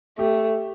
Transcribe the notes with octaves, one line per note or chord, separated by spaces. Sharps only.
A3 G4